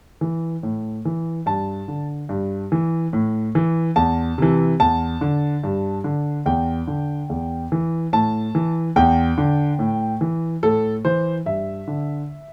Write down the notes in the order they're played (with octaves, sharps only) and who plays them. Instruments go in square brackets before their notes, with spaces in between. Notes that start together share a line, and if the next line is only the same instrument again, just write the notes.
[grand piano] E3
A2
E3
G2 A5
D3
G2
E3
A2
E3
E2 A5
C3 E3
E2 A5
D3
G2
D3
E2 G5
D3
E2
E3
A2 A5
E3
E2 G5
D3
A2
E3
A2 A4
E3 C5
G2 E5
D3